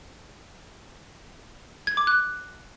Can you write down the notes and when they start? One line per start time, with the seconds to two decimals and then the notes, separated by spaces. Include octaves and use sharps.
1.87 G#6
1.97 D6
2.07 F#6